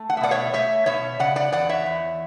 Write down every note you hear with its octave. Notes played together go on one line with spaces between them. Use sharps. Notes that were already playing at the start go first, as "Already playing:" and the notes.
Already playing: A3
F#5
E5
B2 D5 F#5
C#5 E5
A3 C#5 E5
B2 C#5 E5
C#3 D5 F#5
D5 F#5
E2 D5 F#5
C#5 E5
E2